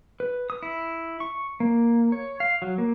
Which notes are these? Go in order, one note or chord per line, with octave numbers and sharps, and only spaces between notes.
B4
D#6
E4
C#6
A#3
C#5
F5
F#3
A#3